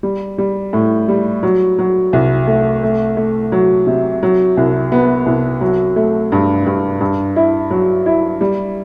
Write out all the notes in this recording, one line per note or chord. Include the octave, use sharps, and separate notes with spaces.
G3
G3
A2
G3
F#3
F#3
C2
A3
A3
A3
F#3
C3
F#3
C2
B3
C2
F#3
A3
G2
G2
G2
E4
F#3
E4
G3